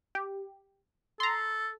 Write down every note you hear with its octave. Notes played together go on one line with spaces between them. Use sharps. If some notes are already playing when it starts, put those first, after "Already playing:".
G4
A4 A#5 C6